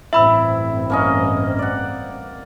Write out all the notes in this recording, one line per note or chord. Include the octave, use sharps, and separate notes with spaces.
A1 G2 C4 E4 E5 B5 E6
A#3 C#4 D#5
D5 F#5